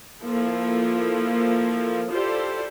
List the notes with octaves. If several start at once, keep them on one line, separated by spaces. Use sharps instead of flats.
F3 A#3 E4 A4
E4 F4 G4 A4 C5 D5